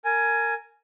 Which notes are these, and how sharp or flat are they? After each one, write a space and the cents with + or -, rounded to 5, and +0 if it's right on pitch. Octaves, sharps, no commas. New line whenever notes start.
A#4 -20 G#5 +10